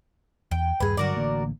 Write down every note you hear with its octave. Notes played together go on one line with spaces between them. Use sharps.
E2 G5
D#1 G2 G#4 B4
G2 D3 F#3 F#4 A#4 D5
A1 D3 A#3